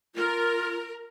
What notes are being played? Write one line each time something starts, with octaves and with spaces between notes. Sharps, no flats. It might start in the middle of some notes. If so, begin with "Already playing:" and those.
F4 A#4